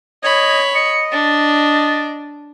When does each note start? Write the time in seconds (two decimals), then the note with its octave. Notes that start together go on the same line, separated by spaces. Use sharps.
0.23 C#5 D#5 B5 G#6
0.75 D#5 C#7
1.12 D4 A6